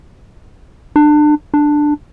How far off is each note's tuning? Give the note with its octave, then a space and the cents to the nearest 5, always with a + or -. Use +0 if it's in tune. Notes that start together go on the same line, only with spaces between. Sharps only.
D4 +30
D4 +10